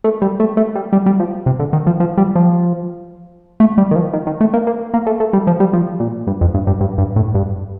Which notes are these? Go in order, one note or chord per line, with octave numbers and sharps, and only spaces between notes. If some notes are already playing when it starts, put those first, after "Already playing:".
A3
G3
A3
A3
G3
G3
G3
F3
C3
D3
D#3
F3
F3
G3
F3
A3
G3
D#3
F3
D#3
D#3
A3
A#3
A#3
A#3
A3
A3
G3
F3
G3
F3
A#2
G2
F2
G2
G2
G2
G2
A2
G2